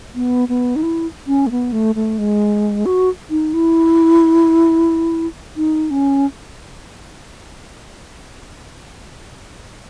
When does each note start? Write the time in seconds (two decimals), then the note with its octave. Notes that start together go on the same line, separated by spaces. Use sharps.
0.15 B3
0.49 B3
0.76 D#4
0.83 E4
1.27 C#4
1.47 A3
1.51 B3
1.72 A3
1.95 A3
2.19 G#3
2.86 F#4
3.30 D#4
3.54 E4
5.57 D#4
5.91 C#4